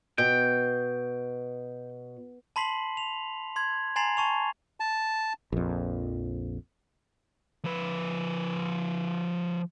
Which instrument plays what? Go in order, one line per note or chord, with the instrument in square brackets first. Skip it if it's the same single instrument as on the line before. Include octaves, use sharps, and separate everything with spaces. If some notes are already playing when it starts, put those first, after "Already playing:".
[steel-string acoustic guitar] B2 [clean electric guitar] G5
[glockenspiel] A5 B5 C6 B6 C7 F#7
F7
C6 G#6
G#5 A#5 C6 A6 C7 F7
A5 C#6 F7
[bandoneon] A5
[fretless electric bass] A#1 F2
[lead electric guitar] F3 B4